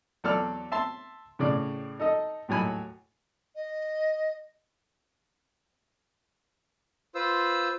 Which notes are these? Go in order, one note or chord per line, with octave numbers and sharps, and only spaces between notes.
E2 F#3 A4 D5 F6
E5 A5 C6
A2 C#3 D5
D#4 A4 D#5
D#2 A2 F#3 G#5 B5
D#5
F4 B4 C5 E6